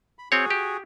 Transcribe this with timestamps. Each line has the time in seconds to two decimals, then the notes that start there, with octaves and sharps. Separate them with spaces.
0.19 B5
0.32 C4 F#4 G#4 C#5
0.50 G4